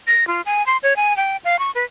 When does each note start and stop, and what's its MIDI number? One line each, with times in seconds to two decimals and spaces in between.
0.07 0.27 94
0.27 0.41 65
0.46 0.65 80
0.66 0.77 84
0.83 0.96 73
0.96 1.16 80
1.17 1.37 79
1.44 1.59 77
1.59 1.71 85
1.75 1.84 71